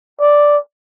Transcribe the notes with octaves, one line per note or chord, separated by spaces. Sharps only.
D5